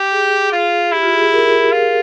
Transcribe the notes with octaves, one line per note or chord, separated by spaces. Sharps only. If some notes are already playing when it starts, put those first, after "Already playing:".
Already playing: G4
G#4
F4
E4 G4
F4
G#4
G#4
A#4
F4